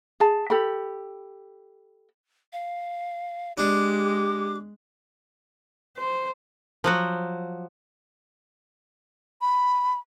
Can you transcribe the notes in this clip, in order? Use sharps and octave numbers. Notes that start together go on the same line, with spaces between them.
G#4 A5
G4 A4 B5
F5
G#3 D4 G4 D6
C5
F3 F#3 F#4
B5